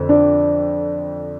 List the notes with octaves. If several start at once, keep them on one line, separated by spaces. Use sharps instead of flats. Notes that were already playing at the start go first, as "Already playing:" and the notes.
Already playing: F2 D3
D4